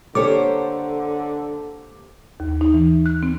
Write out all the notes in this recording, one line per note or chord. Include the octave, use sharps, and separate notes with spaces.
D3 A#3 G4 A4 C5 C#5 D6
D#2
D#4
E3
F#6
C4